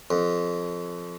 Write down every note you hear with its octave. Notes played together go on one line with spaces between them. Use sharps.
F2